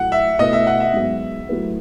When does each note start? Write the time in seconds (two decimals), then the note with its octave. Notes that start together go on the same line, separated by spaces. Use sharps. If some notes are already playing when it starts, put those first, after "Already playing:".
Already playing: A2 F#3 A3 F#5
0.12 E5
0.39 B2 A3 E4 B4 D#5
0.53 E5
0.67 F#5
0.80 E5
0.94 G#2 F#3 B3
1.49 F#3 A3 E4 B4